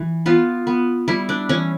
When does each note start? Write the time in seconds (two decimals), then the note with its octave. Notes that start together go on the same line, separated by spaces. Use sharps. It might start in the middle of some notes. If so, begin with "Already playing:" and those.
Already playing: E3
0.26 B3 F4
0.67 B3
1.08 G3 E4
1.29 D4
1.49 E3 C#4